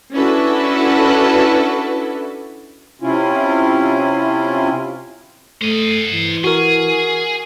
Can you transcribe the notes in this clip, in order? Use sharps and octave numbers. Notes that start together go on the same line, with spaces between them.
C#4 D4 E4 F#4 A4 B4
C3 C#4 E4 F4
A3 C5 D#5
E3
F#4 G#4 A#4